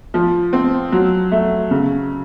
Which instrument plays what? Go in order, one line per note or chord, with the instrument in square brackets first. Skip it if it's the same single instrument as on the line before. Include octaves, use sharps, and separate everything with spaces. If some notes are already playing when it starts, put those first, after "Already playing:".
[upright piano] F3
C4
F#3
A3
C#3